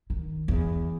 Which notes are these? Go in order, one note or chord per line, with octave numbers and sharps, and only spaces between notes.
D#3
E2